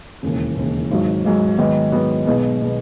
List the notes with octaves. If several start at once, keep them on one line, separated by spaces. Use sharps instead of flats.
E1 D#2 C#3
E1 D#2 C#3
G#1 G#2 F#3
G#1 G#2 F#3
G#2 D#3 F#3 B3
G#2 D#3 F#3 B3
B1 B2 G#3 B3
B2 G#3 B3